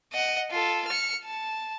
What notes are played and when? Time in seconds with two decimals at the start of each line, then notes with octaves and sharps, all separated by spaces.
0.13 D#5 F#5
0.51 F4 A4
0.87 F6 C#7
1.25 A5